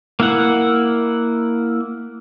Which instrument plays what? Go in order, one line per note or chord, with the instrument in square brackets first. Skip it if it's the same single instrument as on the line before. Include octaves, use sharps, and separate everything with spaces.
[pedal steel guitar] A#3 E4 F#5